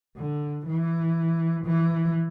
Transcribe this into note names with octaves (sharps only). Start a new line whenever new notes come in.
D3
E3
E3